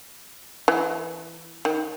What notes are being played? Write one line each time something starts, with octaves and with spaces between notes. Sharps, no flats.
E3
D#3